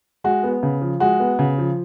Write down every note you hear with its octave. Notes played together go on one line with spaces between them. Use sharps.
G#3 F#4
B3
C#3
F3
G#3 F#4
B3
C#3
F3